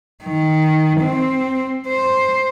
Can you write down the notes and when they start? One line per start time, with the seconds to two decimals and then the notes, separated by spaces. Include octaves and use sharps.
0.25 D#3
1.01 C4
1.87 C5